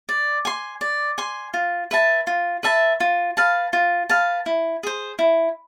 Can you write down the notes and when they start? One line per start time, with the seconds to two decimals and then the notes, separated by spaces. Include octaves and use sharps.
0.09 D5
0.45 G#5 C6
0.81 D5
1.18 G#5 C6
1.54 F4
1.91 B4 E5 A5
2.27 F4
2.63 B4 E5 A5
3.00 F4
3.37 B4 F5 A5
3.73 F4
4.09 B4 F5 A5
4.46 E4
4.83 G#4 C5
5.19 E4